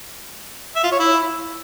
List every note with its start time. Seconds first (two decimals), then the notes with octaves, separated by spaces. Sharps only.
0.76 E5
0.84 F4
0.92 C#5
1.00 E4